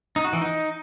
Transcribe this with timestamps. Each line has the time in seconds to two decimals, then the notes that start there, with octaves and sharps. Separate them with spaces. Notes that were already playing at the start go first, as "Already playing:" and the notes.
0.16 D#4
0.25 F#4
0.33 E3
0.41 D#4